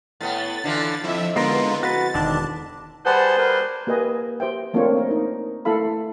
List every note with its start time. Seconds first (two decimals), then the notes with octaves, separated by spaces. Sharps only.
0.21 A2 B3 A6
0.64 D3 E3 F4
1.04 F2 F3 E4 E5
1.36 D3 G#3 B3 F4 A#4
1.83 F#4 B4 A6
2.14 E1 D3 D#3 D4 A5
3.05 G3 G#4 B4 C5 F#5 A5
3.38 A#4 B4
3.87 A#3 G4 B4 D#5 G#5
4.40 G4 C5 E5 G5
4.73 A3 A#3 C4 D4 F4 C#5
4.97 A#4
5.11 D#4
5.65 A3 E4 A4 F5 B5